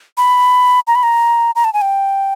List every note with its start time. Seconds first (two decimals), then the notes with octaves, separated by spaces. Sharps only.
0.17 B5
0.87 A#5
0.95 B5
1.03 A#5
1.56 A#5
1.64 A5
1.73 G#5
1.82 G5